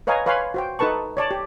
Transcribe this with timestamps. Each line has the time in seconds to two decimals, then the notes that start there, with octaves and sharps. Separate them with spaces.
0.07 B4 C#5 D#5 F5 G#5 A#5
0.26 B4 C#5 F5 G#5 B5 C6
0.54 F#4 C5 G5
0.79 D#4 A4 B4 A5 C#6
1.17 C#5 D5 A5
1.31 G4